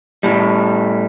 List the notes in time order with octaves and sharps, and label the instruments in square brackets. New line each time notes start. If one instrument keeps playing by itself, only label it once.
[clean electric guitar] A2 G3